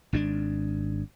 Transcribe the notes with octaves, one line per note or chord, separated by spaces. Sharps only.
G#1 G#2 C4 D4